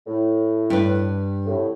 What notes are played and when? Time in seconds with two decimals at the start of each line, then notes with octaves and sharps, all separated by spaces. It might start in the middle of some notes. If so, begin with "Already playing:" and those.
0.07 A2
0.70 G2 B4
1.46 C2 A2